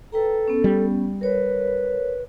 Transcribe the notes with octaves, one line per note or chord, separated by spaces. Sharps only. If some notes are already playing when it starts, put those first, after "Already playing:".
A4 B4 G5 A#5
B3 C#4
G3
A#4 B4 C#5